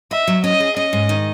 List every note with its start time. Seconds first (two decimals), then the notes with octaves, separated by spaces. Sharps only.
0.11 D#5 E5
0.28 F#3
0.44 C#4 D#5
0.60 G#4
0.76 C#4 D#5
0.93 G#2
1.09 D#3